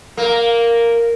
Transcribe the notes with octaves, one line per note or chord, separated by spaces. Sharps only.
A#3